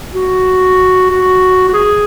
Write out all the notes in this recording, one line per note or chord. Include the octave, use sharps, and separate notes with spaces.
F#4
F#4
F#4
G#4